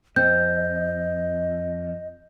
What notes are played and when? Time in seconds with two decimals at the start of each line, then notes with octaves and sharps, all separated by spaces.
0.16 F2 C4 D#5 G6